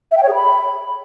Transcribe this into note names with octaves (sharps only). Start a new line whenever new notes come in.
E5
G5
C#5
G#4
B5